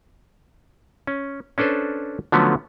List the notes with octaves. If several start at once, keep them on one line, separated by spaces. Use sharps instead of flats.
C#4
C#4 D4 A4 B4 C5
D3 F3 F#3 A3 B3 C#4